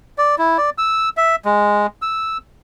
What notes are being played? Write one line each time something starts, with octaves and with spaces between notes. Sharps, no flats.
D5
E4
D5
E6
E5
G#3
E6